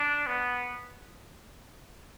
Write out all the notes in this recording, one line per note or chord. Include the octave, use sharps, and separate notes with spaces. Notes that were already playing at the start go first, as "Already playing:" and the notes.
Already playing: D4
B3